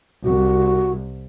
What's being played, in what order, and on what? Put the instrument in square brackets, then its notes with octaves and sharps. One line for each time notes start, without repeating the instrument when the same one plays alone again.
[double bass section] C2 [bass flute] F#4